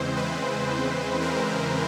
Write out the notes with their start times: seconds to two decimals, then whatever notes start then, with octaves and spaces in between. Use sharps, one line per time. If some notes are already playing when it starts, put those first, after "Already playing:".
Already playing: E2 C#3 E3 G#3 C4 C5
0.16 B4
1.22 A#4